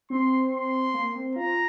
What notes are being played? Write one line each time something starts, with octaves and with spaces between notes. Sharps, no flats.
C4 C6
C6
A#3
C4
F4 A#5